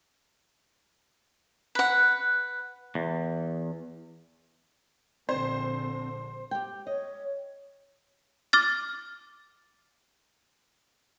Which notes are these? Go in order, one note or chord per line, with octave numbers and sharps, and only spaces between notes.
B4 F#5
E2
A#1 D3 C4 C5
G4 G5
C#5 D#5
D6 F6 A6